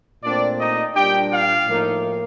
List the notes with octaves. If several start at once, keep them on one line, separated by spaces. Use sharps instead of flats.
A#2 A3 C4 D4 D5
D#4 D#5
A#2 G3 D4 G4 G5
F4 F5
A2 F3 A#3 D#4